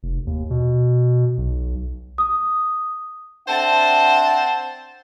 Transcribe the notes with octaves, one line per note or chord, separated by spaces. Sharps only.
F1
D#2
B2
B1
D#6
C4 D4 C5 E5 F#5 A5